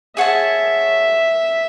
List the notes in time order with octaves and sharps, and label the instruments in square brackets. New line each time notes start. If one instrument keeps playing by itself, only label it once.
[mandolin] G#4 C#5 F#5 A5 [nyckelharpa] E5